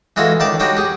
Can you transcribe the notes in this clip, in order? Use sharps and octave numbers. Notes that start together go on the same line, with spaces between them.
E3 G#3 F4 F#4 A4
C#2 D#3 D5 A5 D6
G3 D4 D#4 F#4 C#5
G4 G#4